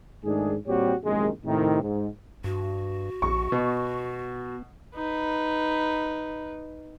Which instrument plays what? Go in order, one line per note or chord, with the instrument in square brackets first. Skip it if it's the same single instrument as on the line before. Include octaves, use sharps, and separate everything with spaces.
[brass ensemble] G#2 D#3 A3 D4 G#4
A#2 G3 C4 F#4 G4 C#5
A#1 F#2 C3 D#3 G#3
A2 C3 D#3
G#2
[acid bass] G2 [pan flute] F#4
[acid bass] A#1 [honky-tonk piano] C#6
[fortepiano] B2 [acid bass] B3
[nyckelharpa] D#4 B4